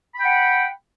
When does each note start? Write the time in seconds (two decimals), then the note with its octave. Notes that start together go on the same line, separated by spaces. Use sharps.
0.15 B5
0.19 G5
0.24 F#5